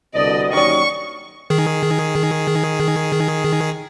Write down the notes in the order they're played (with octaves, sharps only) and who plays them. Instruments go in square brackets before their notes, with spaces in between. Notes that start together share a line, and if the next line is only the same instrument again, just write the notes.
[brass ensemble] C2 B2 D3 [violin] D5 [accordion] D#5
[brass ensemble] D#2 F#3 C#4 [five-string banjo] D#3 D5 [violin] C#6
[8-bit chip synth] D#3 G#4